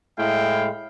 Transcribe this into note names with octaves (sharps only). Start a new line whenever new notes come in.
A2 G#3 E4 F5 G5